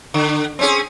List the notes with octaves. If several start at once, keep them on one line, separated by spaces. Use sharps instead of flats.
D3
C4 C#4 G#4